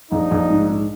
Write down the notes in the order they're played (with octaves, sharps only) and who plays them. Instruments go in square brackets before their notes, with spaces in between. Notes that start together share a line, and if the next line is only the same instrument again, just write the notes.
[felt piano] A#1 [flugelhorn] D#4
[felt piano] A#1
G#2
G#2